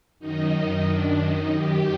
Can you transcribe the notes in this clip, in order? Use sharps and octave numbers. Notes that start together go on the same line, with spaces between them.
F#2 D#3 D#4
D4
D#4
G4